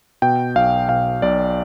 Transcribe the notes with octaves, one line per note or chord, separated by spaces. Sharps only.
B2 G5
B1 F5
B2 F5
B1 D5